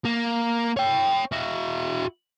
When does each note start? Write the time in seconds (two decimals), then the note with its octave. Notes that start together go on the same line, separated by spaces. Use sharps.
0.05 A#3
0.77 C#5 G5
1.32 E4 F#4